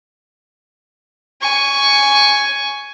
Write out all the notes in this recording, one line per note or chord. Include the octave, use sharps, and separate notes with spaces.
G#5 C#6